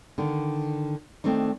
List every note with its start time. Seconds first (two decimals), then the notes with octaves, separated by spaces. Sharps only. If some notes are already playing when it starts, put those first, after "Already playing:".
0.18 D3 D#3
1.24 D#3 A3 C4 D4 D#4